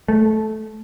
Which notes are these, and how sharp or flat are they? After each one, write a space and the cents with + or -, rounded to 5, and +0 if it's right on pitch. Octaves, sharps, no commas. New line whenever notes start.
A3 -15